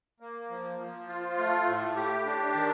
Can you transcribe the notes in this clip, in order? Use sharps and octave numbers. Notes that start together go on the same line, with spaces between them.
A#3
F3
F3
F4
A3
A2
G4
D4
D#3